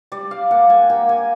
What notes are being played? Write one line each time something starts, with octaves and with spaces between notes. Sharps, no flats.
G3 D5
F5
A#3 F#5
G#5
A#3 G5
G#5